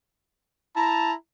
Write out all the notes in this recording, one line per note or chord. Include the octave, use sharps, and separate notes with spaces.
E4 A5 A#5